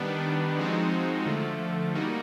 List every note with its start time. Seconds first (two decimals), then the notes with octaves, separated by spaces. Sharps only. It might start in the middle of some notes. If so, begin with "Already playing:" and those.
Already playing: D#3 G3 B3 D4
0.58 F3 G#3 C4 D#4 F#4
1.26 D3 F3 A3
1.95 G3 A#3 D#4 F#4